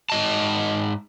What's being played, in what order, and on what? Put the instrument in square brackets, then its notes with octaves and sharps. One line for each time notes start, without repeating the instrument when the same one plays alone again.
[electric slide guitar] G#2 D#5 A5